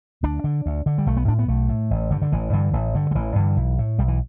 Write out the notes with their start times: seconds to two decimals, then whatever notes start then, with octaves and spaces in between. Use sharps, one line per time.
0.23 D2 D4
0.44 D3
0.66 D2
0.86 D3
0.98 G3
1.06 B1 A3
1.17 B3
1.28 A2 D4
1.39 B3
1.48 B1 A3
1.69 A2
1.91 A1
2.11 G2 D3
2.22 D3
2.32 A1 E3
2.53 G2 D3
2.73 A1
2.94 G2 D3
3.11 G3
3.15 A1 E3
3.35 G2 D3
3.57 B1
3.78 A2
3.98 B1 G3
4.08 E3